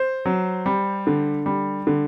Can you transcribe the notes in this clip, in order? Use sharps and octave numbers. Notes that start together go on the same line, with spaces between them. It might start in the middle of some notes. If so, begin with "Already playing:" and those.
Already playing: C5
F#3
G3
D3
G3
D3